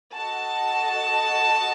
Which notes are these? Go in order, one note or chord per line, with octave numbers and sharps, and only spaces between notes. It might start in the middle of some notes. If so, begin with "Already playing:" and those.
F#4 A4 D#5 A5